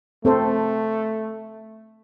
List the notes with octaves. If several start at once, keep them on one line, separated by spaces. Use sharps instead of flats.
A3 C4 A4 C5